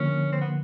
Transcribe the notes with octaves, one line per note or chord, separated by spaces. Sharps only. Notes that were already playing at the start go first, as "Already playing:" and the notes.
Already playing: D3 F3 A#3 C#4
C4
B3